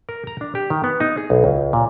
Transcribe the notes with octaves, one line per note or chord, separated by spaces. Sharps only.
A#4
A#5
D4
G4
D#3
B3
D#4
G#4
B1
C#2
A#2